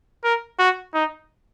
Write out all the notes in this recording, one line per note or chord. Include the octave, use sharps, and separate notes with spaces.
A#4
F#4
D#4